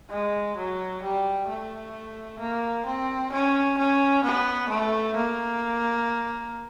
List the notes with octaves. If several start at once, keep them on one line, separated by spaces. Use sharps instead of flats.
G#3
F#3
G3
A3
A#3
C4
C#4
C#4
B3
A3
A#3